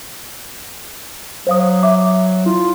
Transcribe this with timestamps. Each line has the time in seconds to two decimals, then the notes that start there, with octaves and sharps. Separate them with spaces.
1.47 F#3 C5 F5 D#6
1.83 E5 D6
2.46 E4 F4